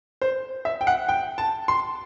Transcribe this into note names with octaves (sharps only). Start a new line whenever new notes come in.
C5
E5
G5
F#5
G5
A5
C6